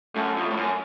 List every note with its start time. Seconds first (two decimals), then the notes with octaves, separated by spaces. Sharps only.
0.15 F#2 A3
0.37 F2
0.50 A2
0.57 F#2